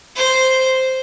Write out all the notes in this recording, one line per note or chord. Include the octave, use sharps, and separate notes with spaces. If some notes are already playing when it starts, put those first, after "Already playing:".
C5